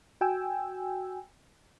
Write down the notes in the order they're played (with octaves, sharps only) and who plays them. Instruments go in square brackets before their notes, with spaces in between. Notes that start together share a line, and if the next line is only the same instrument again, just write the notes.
[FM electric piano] F#4 G5 G#5 E6